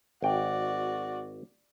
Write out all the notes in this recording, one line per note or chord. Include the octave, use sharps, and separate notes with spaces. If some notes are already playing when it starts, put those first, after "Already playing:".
G#1 F#4 D5 G5